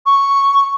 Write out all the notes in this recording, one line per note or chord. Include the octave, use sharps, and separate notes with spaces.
C#6